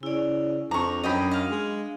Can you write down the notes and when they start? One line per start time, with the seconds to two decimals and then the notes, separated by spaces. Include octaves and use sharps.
0.03 C#3 E4 D5
0.71 F2 D4 A#5 C#6
1.03 F#2 D#5 G5 B5
1.31 D#5 F5
1.51 G#3